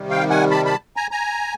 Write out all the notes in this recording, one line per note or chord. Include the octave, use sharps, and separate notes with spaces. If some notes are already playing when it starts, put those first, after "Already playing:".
Already playing: C3 D#3 G3
F5 G5
F#5 G#5
A5 B5
A5 B5
G#5 A#5
G#5 A#5